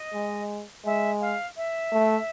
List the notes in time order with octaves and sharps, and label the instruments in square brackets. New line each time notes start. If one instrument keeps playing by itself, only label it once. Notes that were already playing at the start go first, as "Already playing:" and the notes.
Already playing: [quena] D#5
[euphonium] G#3
[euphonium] G#3 [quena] E5
[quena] F5
E5
[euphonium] A3